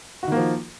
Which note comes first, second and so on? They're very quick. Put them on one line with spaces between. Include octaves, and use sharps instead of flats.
F#4 D#3 A#3 F3